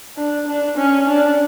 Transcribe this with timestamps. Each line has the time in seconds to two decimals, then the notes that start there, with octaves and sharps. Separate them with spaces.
0.17 D4
0.47 D4
0.77 C#4
1.08 D4